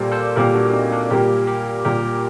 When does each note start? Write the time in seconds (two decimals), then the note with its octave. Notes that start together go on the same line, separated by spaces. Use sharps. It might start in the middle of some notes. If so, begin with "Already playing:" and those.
Already playing: A#2 G3 A#3 A4 A#4 C5 D5
0.11 A4 C5
0.36 A#2 G3 A#3 G4 A#4
0.55 D4 F#4
0.73 C4 D#4
0.91 A#3 D4
1.10 A#2 G3 A#3 G4 A#4
1.47 G4 A#4
1.85 A#2 G3 A#3 G4 A#4